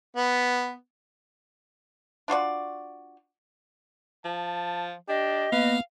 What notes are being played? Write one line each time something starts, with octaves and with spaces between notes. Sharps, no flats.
B3
D4 F4 F#4 D5
F3 A5
D4 G4 D#5
A#3 B3 B4 F5